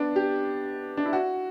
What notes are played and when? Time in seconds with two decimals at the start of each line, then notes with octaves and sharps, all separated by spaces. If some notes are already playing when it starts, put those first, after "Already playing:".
Already playing: B3 D4
0.16 G4
0.97 D4
1.05 E4
1.13 F#4